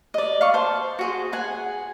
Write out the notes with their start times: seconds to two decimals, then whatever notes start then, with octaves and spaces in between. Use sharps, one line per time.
0.14 D5 D#5
0.41 F5 C#6
0.54 C5 A5
0.99 F#4 G#4 C5
1.33 G#4 F#5 G#5